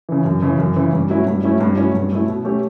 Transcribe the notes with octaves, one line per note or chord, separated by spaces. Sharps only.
C#3 E3
F#2
C#3 E3
F#2
C#3 E3
G2
F#3 A3 C#4 E4
G2
F#3 A3 C#4 E4
G2
F#3 A3 C#4 E4
G2
F#3 A3 C#4 E4
B2
A3 C#4 G4